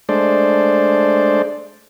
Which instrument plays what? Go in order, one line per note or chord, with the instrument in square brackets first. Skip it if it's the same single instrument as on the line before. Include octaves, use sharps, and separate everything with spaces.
[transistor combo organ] G#3 A3 D4 C5 D5